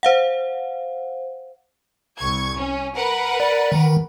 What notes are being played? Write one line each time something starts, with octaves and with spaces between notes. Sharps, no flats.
C5 F5 F#5
C2 C#6 G#6
C#4
A#4 B4 F#5
D5
D#3 E3